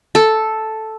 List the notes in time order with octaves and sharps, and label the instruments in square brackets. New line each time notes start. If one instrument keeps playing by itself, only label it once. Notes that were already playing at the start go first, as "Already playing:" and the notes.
[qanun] A4